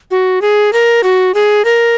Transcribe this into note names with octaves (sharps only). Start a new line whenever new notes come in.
F#4
G#4
A#4
F#4
G#4
A#4